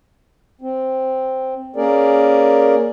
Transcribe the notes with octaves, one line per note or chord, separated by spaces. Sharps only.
C4
A#3 C#4 G#4 A#4 D5